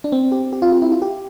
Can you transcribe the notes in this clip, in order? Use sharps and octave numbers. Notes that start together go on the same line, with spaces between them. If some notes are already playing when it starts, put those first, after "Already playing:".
D4
C4
G4
G4
F4
F4
E4
F4
G4